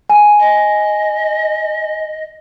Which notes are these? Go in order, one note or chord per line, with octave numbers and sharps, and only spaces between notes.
G#5
D#5